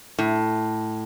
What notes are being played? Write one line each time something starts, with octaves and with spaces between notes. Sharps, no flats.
A2